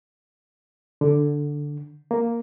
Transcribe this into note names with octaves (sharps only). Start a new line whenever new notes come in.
D3
A#3